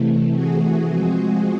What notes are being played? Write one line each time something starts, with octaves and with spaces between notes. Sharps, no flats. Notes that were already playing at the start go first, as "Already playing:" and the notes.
Already playing: C3 E3 A3
F#4 G#4
F3 G#3 C4